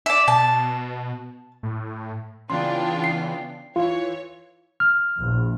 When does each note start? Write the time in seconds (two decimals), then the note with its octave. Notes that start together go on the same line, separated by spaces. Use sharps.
0.06 D5 E5
0.28 B2 A5
1.63 A2
2.50 C#3 E3 B3 D4 F4 G5 C6
3.04 C7
3.76 E3 F4 C#5
4.80 F6
5.18 A#1 E2